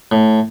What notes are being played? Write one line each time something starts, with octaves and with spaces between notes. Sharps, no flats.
A2